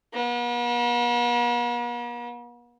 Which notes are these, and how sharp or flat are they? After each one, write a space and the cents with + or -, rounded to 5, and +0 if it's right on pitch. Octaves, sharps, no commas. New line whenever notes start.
B3 -45